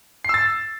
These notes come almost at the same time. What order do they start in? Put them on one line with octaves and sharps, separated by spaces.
C7 E6 A6